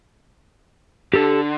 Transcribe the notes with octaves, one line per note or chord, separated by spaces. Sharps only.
D3 G4 A4